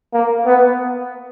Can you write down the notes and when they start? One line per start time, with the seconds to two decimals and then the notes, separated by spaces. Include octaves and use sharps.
0.13 A#3
0.46 B3